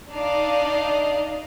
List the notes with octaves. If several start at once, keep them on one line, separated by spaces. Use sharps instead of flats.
D4 D#4 D5 D#5 F5